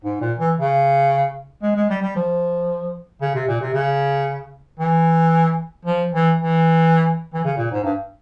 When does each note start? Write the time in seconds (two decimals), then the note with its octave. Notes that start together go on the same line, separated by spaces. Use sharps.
0.04 G#2
0.21 A#2
0.39 E3
0.57 C#3
1.62 G#3
1.76 G#3
1.90 G3
2.02 G3
2.16 F3
3.21 C#3
3.35 C3
3.48 A#2
3.61 C3
3.74 C#3
4.79 E3
5.85 F3
6.12 E3
6.38 E3
7.34 E3
7.44 C#3
7.57 A#2
7.71 G#2
7.84 G2